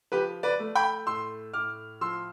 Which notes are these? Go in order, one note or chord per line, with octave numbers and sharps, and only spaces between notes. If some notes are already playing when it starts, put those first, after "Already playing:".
F3 G4 B4
B4 D5
A3
G5 B5
A2 C6 E6
A2 D6 F6
F3 C6 E6